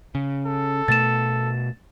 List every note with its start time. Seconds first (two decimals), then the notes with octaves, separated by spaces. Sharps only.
0.15 C#3
0.46 A4
0.88 B2 A3 A6 E7